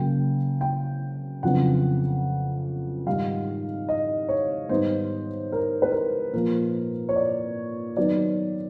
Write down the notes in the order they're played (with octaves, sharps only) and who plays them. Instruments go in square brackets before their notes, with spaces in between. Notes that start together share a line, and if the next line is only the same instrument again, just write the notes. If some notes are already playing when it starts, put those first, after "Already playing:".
Already playing: [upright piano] C#3 F#3 A#3 G5
G5
F2 C#3 F#3 B3 D4 F#5
G#2 D#3 G3 F5
D#5
C#5
G#2 D#3 G3 B3 D#4 C5
A#4
B4
A#4
A#2 F3 A#3 A#4
C#5
D5
D#3 F#3 B3 D#4 D5